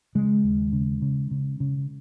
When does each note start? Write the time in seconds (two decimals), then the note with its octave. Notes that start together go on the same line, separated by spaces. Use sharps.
0.15 C#3 G#3
0.44 D#2
0.73 C#3
1.02 C#3
1.31 C#3
1.60 C#3